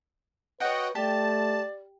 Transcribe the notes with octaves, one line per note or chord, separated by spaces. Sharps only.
F#4 B4 C#5 D#5 F#5 G5
A3 G4 D5 A5